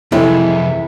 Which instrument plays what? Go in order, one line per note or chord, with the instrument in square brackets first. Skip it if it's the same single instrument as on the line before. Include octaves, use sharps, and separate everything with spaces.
[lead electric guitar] C2 F2 [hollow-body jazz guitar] C3 E3 G#3 [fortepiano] E4 A4 [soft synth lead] E5